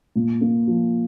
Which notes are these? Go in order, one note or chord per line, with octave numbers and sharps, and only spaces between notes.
A#2
A#3
F3